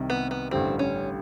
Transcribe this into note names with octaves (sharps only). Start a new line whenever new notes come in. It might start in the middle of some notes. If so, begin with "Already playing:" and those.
Already playing: C2 C3 D#3
B3
B3
A1 G2 D3 G3 C4
C#4